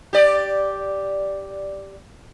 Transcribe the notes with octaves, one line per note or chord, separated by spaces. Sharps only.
G4 D5